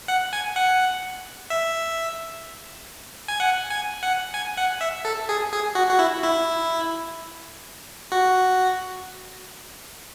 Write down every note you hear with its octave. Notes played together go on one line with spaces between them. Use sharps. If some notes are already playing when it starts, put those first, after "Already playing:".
F#5
G#5
F#5
E5
G#5
F#5
G#5
F#5
G#5
F#5
E5
A4
G#4
G#4
F#4
F#4
E4
E4
F#4